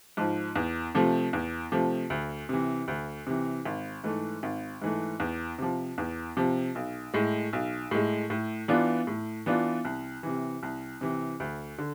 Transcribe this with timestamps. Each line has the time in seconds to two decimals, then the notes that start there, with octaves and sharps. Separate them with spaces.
0.17 G#2 F3
0.56 E2
0.95 C3 F3 A3
1.33 E2
1.72 C3 F3 A3
2.10 D2
2.49 C3 E3
2.88 D2
3.27 C3 E3
3.65 G#1
4.04 G#2 E3 A3
4.43 G#1
4.82 G#2 E3 A3
5.20 E2
5.59 C3 F3
5.98 E2
6.37 C3 F3
6.75 B1
7.14 A2 G#3
7.53 B1
7.91 A2 G#3
8.30 A2
8.68 E3 B3 D4 F4
9.07 A2
9.46 E3 B3 D4 F4
9.85 C2
10.23 C3 E3
10.63 C2
11.01 C3 E3
11.40 D2
11.78 D3